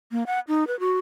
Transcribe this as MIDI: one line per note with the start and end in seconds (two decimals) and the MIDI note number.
0.12 0.23 58
0.27 0.40 78
0.48 0.67 63
0.67 0.79 71
0.80 0.98 66